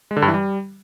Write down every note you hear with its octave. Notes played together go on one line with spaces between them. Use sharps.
G#3
D3
G2
E3
G3